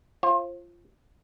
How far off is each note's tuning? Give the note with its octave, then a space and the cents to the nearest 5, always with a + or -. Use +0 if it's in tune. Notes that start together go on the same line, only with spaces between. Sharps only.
F4 -15 C5 +35